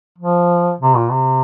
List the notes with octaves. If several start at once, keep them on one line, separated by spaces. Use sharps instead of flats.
F3
C3
A#2
C3